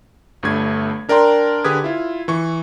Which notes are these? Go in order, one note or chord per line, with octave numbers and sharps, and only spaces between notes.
G1 G2 A3 G#6
D4 A#4 D5 G5 A#5 C6
D3 G4 G#4 B4 D#6 G#6
E4 F4
E3 C#6